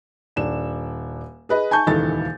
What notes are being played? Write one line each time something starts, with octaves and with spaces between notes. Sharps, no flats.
D#1 D4 E7
G#4 B4 D#5
G#5 A5 C#6 G6
D#1 C#2 D#3 E3 A4 A6